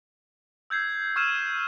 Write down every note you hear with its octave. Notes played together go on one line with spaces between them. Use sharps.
E6 G6 G#6 C7
C#6 E6 F6 G#6 D#7 E7